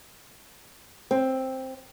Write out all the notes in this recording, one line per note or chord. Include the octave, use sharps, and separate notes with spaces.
C4